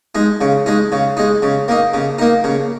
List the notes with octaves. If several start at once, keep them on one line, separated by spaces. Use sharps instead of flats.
G#3 D#4
C#3
G#3 D#4
C#3
G#3 D#4
C#3
A#3 D#4
C#3
A#3 D#4
C#3